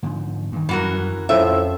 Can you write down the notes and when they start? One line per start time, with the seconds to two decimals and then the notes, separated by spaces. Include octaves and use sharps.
0.03 G#2 D3 F3
0.52 G2 D#3
0.69 F#2 E3 G3 F#4 A#4
1.29 F2 A2 F3 C#4 E5